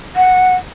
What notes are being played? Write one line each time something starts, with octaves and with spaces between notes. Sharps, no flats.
F#5